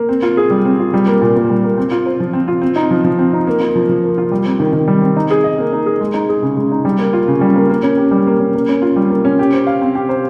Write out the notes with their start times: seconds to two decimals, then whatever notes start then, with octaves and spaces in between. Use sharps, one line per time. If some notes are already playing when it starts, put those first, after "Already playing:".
Already playing: A#3
0.09 C4
0.23 F4
0.37 G#4
0.50 G3
0.65 C4
0.79 F4
0.94 G3
1.07 A#3
1.22 A#2
1.36 A#2
1.49 G3
1.63 A#3
1.78 C4
1.91 F4
2.06 C5
2.20 F3
2.33 C4
2.48 F4
2.62 C4
2.76 D#4
2.91 F3
3.04 F3
3.19 C4
3.33 D#4
3.47 A#3
3.60 F4
3.75 F3
3.89 F3
4.04 A#3
4.18 F4
4.32 G3
4.45 C4
4.60 D#3
4.73 D#3
4.88 G3
5.02 C4
5.16 D#4
5.31 G#4
5.44 D#5
5.58 A#3
5.72 D#4
5.86 G#4
6.01 G#3
6.14 D#4
6.29 G#4
6.43 C#3
6.57 G#3
6.72 D#4
6.85 G3
6.99 A#3
7.13 F4
7.28 C#3
7.41 G3
7.56 A#3
7.70 A#3
7.83 C#4
7.97 G4
8.11 G3
8.27 A#3
8.40 C#4
8.54 A#3
8.69 C#4
8.82 F4
8.96 G3
9.10 A#3
9.25 C#4
9.39 G4
9.53 C5
9.67 F5
9.81 C4
9.95 G4
10.09 C5